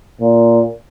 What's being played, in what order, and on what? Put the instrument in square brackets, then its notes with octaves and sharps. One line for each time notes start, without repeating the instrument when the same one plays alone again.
[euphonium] A#2